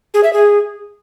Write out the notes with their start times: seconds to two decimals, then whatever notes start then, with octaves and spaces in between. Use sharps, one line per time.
0.14 G#4
0.24 E5
0.33 G#4